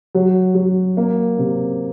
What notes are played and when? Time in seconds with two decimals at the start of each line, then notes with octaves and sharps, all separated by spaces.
0.15 F#3
0.55 F#3
0.97 A#3
1.38 C3